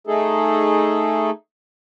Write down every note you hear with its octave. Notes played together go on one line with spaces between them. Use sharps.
A3 D#4 G#4 A4